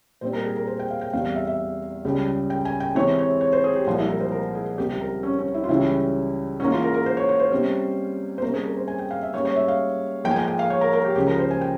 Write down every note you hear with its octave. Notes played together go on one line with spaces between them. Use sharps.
A#2 G3 C4 C5
A#4
G#4
A#4
C5
G5
F5
G5
E2 C3 G3 F5
F5
E5
E5
C#2 C#3 G3
G5
G#5
G5
C3 E3 G#3 C4 C#5
C#5
C#5
C5
G#4
G4
C2 A#2 F3 G#3 F4
E4
A#4
C5
A#4
G#4
C#2 C3 G3 C4 G4
G4
A#4
C#4
C#4
E4
F4
C#2 C#3 E3 G3 C#4 E4
G#2 E3 A#3 C#4
F4
A#4
A#4
C5
C#5
C#5
C5
C3 G3 C#4
C5
C3 G3 A#3 C#4 A#4
G#4
A#4
C5
G#5
G5
F5
E5
G#2 G3 A#3 C#4 C#5
C#5
E5
F5
G#2 F3 A#3 G5
G#5
G5
G5
F5
C#5
A#4
A#4
G4
C#2 C#3 F3 G4
A#4
C5
G#5
G5